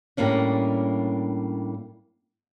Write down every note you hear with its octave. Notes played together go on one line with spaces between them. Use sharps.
A2 G3 A#3 C#4 D4